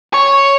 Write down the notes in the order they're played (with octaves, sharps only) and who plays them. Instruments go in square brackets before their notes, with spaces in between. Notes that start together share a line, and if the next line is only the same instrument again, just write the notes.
[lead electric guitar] C#5